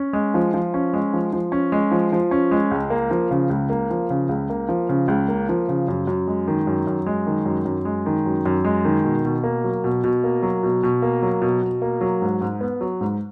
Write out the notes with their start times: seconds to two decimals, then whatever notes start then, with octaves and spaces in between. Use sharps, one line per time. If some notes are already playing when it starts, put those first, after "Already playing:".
Already playing: C#4
0.13 G#3
0.34 F3
0.54 F3
0.74 C#4
0.93 G#3
1.13 F3
1.33 F3
1.52 C#4
1.72 G#3
1.91 F3
2.12 F3
2.31 C#4
2.51 G#3
2.71 C#2
2.90 A#3
3.11 F3
3.31 C#3
3.50 C#2
3.70 A#3
3.90 F3
4.10 C#3
4.29 C#2
4.50 A#3
4.69 F3
4.89 C#3
5.08 C#2
5.28 A#3
5.49 F3
5.69 C#3
5.88 F#2
6.07 F#2
6.27 G#3
6.48 D#3
6.67 F#2
6.87 F#2
7.06 G#3
7.27 D#3
7.46 F#2
7.65 F#2
7.85 G#3
8.06 D#3
8.26 F#2
8.46 F#2
8.64 G#3
8.85 D#3
9.04 B2
9.25 B2
9.44 A#3
9.64 F#3
9.84 B2
10.04 B2
10.24 A#3
10.43 F#3
10.63 B2
10.83 B2
11.02 A#3
11.22 F#3
11.42 B2
11.62 B2
11.82 A#3
12.01 F#3
12.22 G#2
12.41 G#2
12.61 B3
12.81 F#3
13.01 G#2